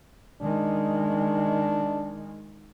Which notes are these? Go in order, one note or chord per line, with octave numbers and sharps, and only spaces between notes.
D#3 G#3 D4